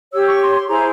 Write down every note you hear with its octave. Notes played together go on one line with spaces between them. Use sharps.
G4 C#5 E6
C#6
C6
C6
E4 G#4 C5 A#5